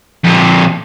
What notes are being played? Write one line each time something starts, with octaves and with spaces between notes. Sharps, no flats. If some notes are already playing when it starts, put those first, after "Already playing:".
F2 A#2